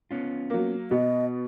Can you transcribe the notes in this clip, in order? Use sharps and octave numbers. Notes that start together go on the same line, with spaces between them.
B3 C#4 F4
F#3 A#3
B2 B3 D#5